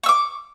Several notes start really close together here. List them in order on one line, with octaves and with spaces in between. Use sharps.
C#6 E6 D6